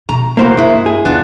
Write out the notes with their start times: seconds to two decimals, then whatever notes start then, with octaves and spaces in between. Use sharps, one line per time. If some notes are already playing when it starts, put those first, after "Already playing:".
0.09 B2 A#5
0.37 C2 A#2 E3 A#3 F#4 C5
0.57 G2 G#3 E4
0.86 G#4
1.05 E2 C#3 B3 D4 F4